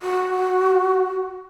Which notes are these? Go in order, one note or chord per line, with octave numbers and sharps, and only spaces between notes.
F#4